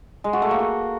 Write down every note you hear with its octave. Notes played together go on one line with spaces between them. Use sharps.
G#3
F#4
A3
A#3
F#4